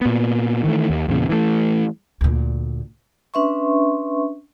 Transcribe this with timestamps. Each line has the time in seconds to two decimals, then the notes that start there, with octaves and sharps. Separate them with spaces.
0.01 A#2 B3
0.64 D#3 E3 A3
0.90 D#2
1.08 E2 A#2 C#3
1.29 E3 A3
2.21 D2 A#2
3.34 C#4 D4 B4 E5 C6 C#6